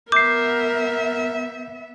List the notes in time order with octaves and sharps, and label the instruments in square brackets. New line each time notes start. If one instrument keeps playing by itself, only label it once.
[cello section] B3 E5 [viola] A#4 [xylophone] D6 [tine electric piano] G6 C7